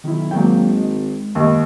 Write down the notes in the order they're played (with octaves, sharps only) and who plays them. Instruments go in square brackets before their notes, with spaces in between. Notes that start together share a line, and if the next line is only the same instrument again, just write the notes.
[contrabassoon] B1 [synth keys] D#3 E4
[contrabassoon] G#1 [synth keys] D#3 F#3 A#3 [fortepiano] G5
[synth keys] G#3
[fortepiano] D#2